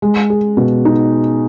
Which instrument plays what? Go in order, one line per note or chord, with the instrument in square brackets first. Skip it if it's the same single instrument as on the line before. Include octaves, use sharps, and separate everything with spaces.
[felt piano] G#3
G#4
B2
D#4